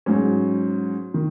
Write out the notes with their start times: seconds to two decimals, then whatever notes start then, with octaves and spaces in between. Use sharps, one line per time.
0.06 G#2 F#3 C#4
1.14 D#3